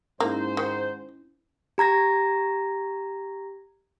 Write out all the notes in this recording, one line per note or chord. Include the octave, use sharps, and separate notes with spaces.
G#2 A#3 C#4 E4 C5
D#3
G4 A#5 G#6 A#6